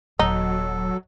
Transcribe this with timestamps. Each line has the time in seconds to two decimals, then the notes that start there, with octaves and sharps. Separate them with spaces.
0.19 D#1 F#3 D#4 A4